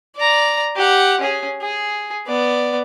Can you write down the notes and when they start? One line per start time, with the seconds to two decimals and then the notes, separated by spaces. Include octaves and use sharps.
0.16 D5 A#5
0.76 G4 F#5
1.20 C#4 G#4
1.61 G#4
2.27 B3 D5